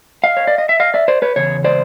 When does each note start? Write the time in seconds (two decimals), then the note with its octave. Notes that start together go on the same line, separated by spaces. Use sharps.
0.24 D#5 F5
0.37 C#5
0.47 D5
0.58 D#5
0.69 E5
0.80 D#5 F5
0.94 D5 E5
1.08 C5 D5
1.22 B4 C#5
1.36 E2 C#3 C#5
1.64 C5 D5